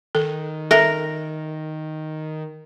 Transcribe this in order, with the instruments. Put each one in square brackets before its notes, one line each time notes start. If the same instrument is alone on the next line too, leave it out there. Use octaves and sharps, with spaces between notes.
[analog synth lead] D#3 [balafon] A4
[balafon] A4 E5 [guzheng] A#4